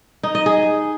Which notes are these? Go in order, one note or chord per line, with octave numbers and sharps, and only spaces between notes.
D#4
D#5
G#4